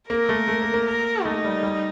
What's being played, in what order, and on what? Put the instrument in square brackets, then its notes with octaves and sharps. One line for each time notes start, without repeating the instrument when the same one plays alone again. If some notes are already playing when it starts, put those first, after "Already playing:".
[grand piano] A#3 [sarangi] A#4
[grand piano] A3
A3
A#3
A#3
[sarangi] A#4
[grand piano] A3 [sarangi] D#4
[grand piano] G3
G3